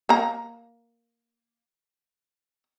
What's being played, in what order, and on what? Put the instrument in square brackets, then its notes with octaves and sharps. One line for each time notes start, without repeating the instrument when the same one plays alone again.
[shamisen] A#3 A#5